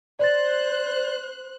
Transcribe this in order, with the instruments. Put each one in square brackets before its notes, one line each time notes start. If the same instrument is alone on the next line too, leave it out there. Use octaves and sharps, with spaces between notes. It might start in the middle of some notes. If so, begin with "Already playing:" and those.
[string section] C5 F#6 [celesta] D5 A6